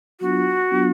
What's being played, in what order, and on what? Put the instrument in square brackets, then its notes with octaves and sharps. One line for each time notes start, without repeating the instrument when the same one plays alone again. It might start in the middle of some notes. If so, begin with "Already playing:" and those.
[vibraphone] F#3 B3 D4 F4 [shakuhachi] F#4
[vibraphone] F#3 B3 D4 F4